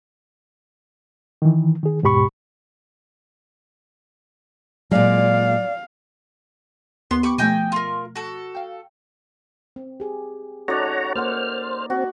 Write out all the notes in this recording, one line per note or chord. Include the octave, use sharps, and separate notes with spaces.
D#3 E3
D#3 G#4
D#2 G#2 B2 G4 B5 C#6
A#2 F#3 G#3 D5 F5
D#2 B3 C6
G4 G5 B5 C#6 D6
B2 F3 A3 D#5 G5 G#5
F4 A#4
F#4 A4
F5 G5
C4
G4 G#4
C#4 D#4 F#4 A4 C#5 D5 F#5 A#5
A#3 C5 C#5 F#5 F6
C4 F#4